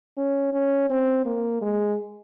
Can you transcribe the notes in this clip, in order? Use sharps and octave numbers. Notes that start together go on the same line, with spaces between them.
C#4
C#4
C4
A#3
G#3